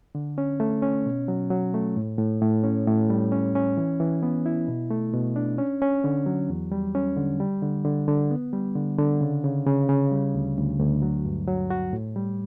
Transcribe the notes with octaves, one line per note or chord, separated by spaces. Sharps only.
D3
C#4
A3
C#4
B2
F#3
F#3
A3
A2
A2
A2
C#4
A2
G3
C#4
C#4
E3
E3
B3
E4
B2
A3
B2
D4
C#4
C#4
D3
F#3
E2
G3
C#4
D3
G3
D3
D3
D3
B3
G3
D3
D3
C#3
C#3
C#3
C#3
G3
D2
D2
D2
F#3
G2
F#3
F#4
A2
G3